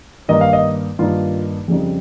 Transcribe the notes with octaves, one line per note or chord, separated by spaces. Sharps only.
G2 D#3 A#3 D#4 D#5
F5
D#5
G2 D#3 A#3 D#4 F4
F2 C#3 G3 C4 D#4